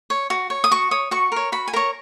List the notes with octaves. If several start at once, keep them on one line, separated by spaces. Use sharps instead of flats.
C#5
F#4
C#5
D#6
F#4 C#6
C#5 D#6
F#4 C#6
A#4 C#5
F#4 B5
G#5
A#4 C#5 A#5